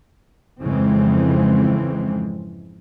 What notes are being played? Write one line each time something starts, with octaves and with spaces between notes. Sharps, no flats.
F2 G#2 C#3 E3 G#3 C4